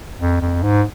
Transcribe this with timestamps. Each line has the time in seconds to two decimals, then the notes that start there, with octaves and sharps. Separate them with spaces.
0.20 F2
0.42 F2
0.63 G#2